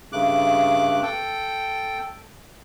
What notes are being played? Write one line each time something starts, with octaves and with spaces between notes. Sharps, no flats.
G2 C#3 A3 D6 F#6
A4 G5